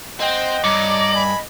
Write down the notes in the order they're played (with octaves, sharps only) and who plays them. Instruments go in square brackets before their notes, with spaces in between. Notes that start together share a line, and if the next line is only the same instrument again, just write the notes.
[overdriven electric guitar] C4 [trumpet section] C5 F#5 G5 [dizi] D#5
[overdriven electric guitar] G2 [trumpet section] C#5 A#5 D6 [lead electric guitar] D5
[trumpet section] G#5 B5